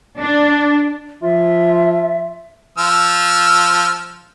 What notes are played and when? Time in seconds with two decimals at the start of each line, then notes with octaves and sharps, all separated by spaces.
0.20 D4
1.23 F3 F4 E5
2.78 F3 E6 F6